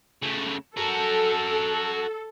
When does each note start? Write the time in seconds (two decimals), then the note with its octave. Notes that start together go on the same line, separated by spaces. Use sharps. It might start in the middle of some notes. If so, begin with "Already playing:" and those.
0.22 C#3 A3
0.77 F#4 A4 A#4